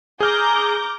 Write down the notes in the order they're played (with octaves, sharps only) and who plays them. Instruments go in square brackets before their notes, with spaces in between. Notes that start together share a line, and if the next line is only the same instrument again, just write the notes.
[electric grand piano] G#4 F6 [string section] A#5 D6 G6